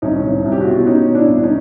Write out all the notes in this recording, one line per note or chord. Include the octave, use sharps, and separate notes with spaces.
C2 C#4 D#4
C2
C2
G4
F#4
B2 F4
E4
B2 C#4 D#4
B2
D4 E4
C2
C#4 D#4